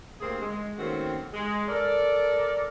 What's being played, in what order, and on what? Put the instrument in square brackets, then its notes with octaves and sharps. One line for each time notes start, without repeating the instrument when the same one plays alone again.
[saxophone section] D2 C3 A#3 C4 G#4
G#3
D#3 A3 A#3 C4 C#4 F#4
G#3
A4 A#4 D5